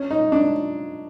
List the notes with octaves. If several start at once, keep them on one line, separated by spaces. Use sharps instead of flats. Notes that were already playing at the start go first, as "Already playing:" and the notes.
Already playing: C#4
D#4
D4